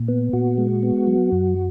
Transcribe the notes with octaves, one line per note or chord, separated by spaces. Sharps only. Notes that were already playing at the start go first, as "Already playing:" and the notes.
Already playing: A#2
B3
A#2 F#4
G#3
B3
F#3
F#2